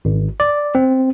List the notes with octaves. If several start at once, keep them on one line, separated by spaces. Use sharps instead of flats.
G#1
D5
C4